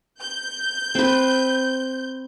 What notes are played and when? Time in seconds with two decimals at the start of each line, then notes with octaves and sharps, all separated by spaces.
0.20 G6
0.95 C4 B4